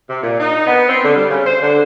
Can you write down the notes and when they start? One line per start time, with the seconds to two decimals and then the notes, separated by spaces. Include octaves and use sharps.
0.10 C3
0.23 A#2
0.40 D#4
0.67 B3
0.89 C4
1.04 D3
1.16 G3
1.30 C#3
1.46 C5
1.62 D3